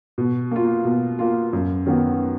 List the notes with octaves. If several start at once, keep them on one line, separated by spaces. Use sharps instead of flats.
B2
A#3 F4
B2
A#3 F4
F#2
D#3 F#3 B3 F#4